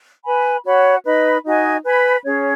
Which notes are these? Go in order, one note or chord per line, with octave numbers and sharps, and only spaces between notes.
B4 G#5 B5
F#4 C#5 F#5 B5
D#4 B4 D#5 B5
D#4 F#4 D#5 G#5
B4 G#5 B5
C#4 G#4 C#5